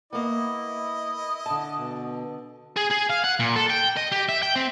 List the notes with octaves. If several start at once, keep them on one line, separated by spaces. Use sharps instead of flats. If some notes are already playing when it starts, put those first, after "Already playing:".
A#3 B3 E4 D#5
D3 A5
B2
G#4
G#4
F5
F#5
A#2
A4
G5
D#5
G4
E5
G5
C4